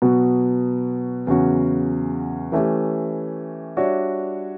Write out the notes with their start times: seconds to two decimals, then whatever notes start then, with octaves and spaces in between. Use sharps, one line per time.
0.02 B2 F#3 B3 F#4
1.27 E2 C#3 F#3 C#4 F#4
2.52 E3 A3 C#4 G4
3.77 G3 D4 F#4 C#5 E5